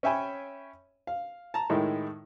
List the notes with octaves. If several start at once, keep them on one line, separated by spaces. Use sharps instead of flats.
C#4 C#5 E5 G5 G#5 B5
F5
A5 A#5
A2 D#3 G#3 E4